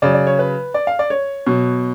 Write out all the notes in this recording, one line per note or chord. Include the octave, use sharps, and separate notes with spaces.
C#3 F#3 D5
D5
C#5
B4
D5
F5
D5
C#5
B2 F#3